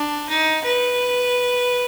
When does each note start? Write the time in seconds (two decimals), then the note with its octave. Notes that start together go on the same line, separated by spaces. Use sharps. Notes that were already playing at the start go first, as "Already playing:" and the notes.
Already playing: D4
0.29 D#4
0.64 B4